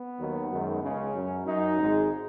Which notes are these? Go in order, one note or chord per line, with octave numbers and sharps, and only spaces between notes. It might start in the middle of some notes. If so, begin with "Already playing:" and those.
Already playing: B3
D#2 D#3 F#3
F#2 D#3 G#3
C#2 C#3 G#3 C#4
F#2 F#3
F#2 F#3 D#4
G#1 G#2 G#3